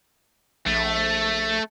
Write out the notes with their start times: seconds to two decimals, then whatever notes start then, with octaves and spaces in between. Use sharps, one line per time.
0.66 A#1 A3